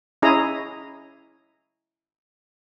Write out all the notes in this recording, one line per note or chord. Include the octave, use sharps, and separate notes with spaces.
C#4 E4 G#4 D#5 A#5 D#6